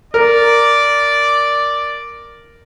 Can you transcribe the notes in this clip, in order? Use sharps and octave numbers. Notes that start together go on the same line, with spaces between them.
A#4 D5